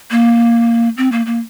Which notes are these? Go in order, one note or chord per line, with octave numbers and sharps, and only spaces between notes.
A#3
C4
A#3
A#3